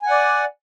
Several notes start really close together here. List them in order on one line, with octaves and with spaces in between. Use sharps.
G#5 F#5 D5